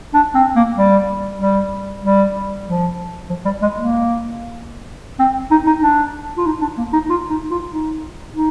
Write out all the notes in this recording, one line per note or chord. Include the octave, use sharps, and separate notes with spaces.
D4
C4
A#3
G3
G3
G3
F3
F3
G3
G#3
A#3
C4
D#4
D#4
D4
F4
D#4
D4
A#3
D#4
F4
D#4
F4
D#4
D#4